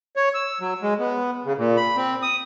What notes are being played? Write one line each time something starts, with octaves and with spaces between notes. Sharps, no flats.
C#5
E6
F#3
G#3
B3
C#3
A#2
B5
C4
D#6